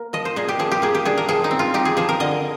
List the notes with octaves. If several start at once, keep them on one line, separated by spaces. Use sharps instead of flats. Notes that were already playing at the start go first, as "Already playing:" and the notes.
Already playing: A#3 A#4
F3 D#5
C5
A#2 G#4
G4
F3 G#4
G4
A#3 G#4
G4
D4 G#4
A#4
F3 G#4
D#4
C4
F4
D#4 G4
G#4
F3 G#4
A#4
D3 D#5